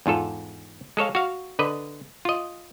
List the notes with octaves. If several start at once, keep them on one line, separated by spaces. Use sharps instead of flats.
E2 G#2 F4 A4
G#3 A4 C#5 F5
F#4 F5
D3 B4 D#5
F4 D#5